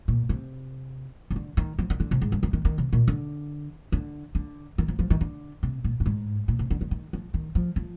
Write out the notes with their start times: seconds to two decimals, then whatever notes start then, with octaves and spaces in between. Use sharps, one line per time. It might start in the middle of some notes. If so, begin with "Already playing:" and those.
0.08 A#2
0.29 C3
1.30 C3
1.36 D3
1.57 D#3
1.79 F3
1.90 D#3
2.00 D3
2.11 C3
2.22 G#2
2.32 G2
2.43 F3
2.53 D#3
2.65 D#3
2.78 C3
2.93 A#2
3.08 D3
3.92 D3
4.35 D3
4.78 D#3
4.88 F3
4.99 F3
5.10 D#3
5.21 D3
5.63 C3
5.84 A#2
6.00 G2
6.06 G#2
6.48 A#2
6.59 C3
6.71 D3
6.81 D#3
6.91 D#3
7.13 F3
7.34 D#3
7.55 F3
7.76 F3